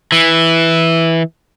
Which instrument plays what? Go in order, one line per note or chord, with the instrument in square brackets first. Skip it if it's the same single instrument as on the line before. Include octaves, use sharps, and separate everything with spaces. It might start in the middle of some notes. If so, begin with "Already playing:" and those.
[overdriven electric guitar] E3